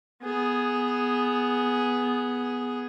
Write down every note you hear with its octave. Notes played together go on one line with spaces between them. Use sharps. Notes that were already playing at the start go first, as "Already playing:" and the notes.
B3 G#4